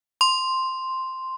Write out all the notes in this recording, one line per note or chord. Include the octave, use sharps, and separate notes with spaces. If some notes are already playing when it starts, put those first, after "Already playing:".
C6